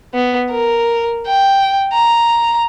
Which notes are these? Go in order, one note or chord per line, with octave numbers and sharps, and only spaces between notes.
B3
A#4
G5
A#5